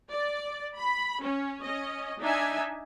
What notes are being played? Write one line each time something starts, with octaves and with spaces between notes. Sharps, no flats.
D5
B5
C#4
C#4 D#5
D4 D#4 E5 G#5